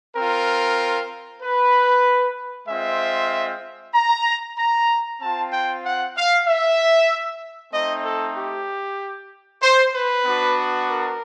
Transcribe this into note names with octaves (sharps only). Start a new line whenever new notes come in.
C4 F4 A#4
B4
G#3 C4 F4 E5
A#5
A#5
C4 F4 A5
G5
F#5
F5
E5
A3 C4 D#4 D#5
A4
G4
C5
B4
B3 D4 F#4
A#4